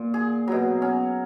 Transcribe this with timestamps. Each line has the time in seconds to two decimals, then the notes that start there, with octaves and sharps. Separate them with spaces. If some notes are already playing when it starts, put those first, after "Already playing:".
Already playing: A#2
0.14 G#4
0.48 B2 F#3
0.82 C#4